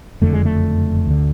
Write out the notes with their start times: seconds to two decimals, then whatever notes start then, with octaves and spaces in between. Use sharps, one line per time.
0.21 F#1 F2 D3 A3
0.33 G#3
0.45 A3
1.06 D2 D3